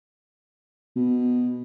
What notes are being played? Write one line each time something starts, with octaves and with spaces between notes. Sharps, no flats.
B2